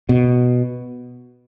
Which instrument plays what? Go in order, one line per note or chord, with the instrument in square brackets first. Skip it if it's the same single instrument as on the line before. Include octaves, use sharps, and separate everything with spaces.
[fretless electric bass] B2